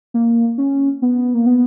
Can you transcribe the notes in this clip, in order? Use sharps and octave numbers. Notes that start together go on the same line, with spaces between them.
A#3
C#4
B3
A#3
B3